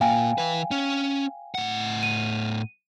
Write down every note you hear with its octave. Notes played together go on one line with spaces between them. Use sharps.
A#2 A#3 F5 G5 G#5
E3 B4
C#4
A2 F#5
D#7